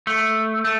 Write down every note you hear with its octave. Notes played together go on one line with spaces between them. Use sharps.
A3
A3